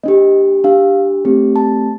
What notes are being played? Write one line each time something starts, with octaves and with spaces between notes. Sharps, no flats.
A#3 D4 G4 D#5
D4 G4 F5
A3 C4 G4
A5